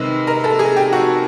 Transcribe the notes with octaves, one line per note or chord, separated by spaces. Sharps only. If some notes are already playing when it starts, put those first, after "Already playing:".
Already playing: C3 D#3 G#3 C4 B4
A#4
A4
G#4
G4
F#4